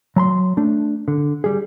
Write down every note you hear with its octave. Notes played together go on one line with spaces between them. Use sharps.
F#3 A#5 C6
A3 D4
D3
G3 G#4